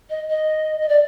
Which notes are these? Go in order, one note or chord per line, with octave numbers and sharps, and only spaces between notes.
D#5
D#5
D#5
D5